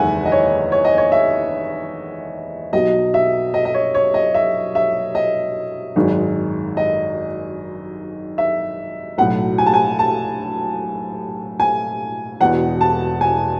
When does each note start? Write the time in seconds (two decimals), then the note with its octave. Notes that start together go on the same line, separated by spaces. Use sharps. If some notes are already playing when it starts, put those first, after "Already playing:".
Already playing: F#1 E2 D#3 G#3 E5 F#5 G#5
0.25 D#5
0.32 C#5
0.72 C#5
0.85 D#5
0.98 C#5
1.12 E5
2.73 B1 B2 F#3 D#5
3.14 E5
3.54 D#5
3.65 D#5
3.74 C#5
3.95 C#5
4.14 D#5
4.34 E5
4.75 E5
5.15 D#5
5.96 G#1 F#2 D#3 G#3
6.77 D#5
8.38 E5
9.18 B1 A2 F#3 F#5
9.58 G#5
9.66 A5
9.74 G#5
9.99 A5
11.60 G#5
12.40 E1 E2 B2 F#5
12.81 A5
13.21 G#5